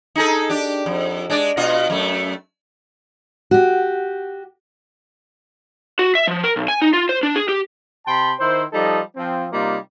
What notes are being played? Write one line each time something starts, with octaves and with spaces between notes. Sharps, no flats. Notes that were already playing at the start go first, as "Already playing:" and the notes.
D#4 G#4 A4
D4 G4
F2
G#3 D4 D5
B2 F4 D#5
F#2 A3
F#4 G4
F#4
E5
F3
A#4
B1
G#5
D#4
F4
C5
D4
G#4
G4
C3 G5 A5 B5 C6
D#3 E4 C5
F3 G3 D#4 A4 D#5
F3 C4
C3 G3 A#3 D#4 F4